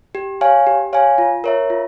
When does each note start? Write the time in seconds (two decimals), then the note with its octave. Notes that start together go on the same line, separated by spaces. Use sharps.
0.15 G4
0.41 C#5 F5 G#5
0.67 G4
0.93 C#5 F5 G#5
1.18 F4
1.44 A#4 C#5 E5
1.70 F4